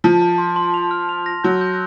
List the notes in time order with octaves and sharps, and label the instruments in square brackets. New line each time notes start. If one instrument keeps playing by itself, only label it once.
[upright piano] F3 [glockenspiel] A5
[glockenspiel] A5
C6
C6
F7
F6
F7
A#6
[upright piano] F#3 [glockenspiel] G6
[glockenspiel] G6